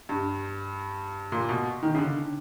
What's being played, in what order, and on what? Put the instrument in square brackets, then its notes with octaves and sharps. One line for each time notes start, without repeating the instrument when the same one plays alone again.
[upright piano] G2
A#2
B2
D#3
C#3
D3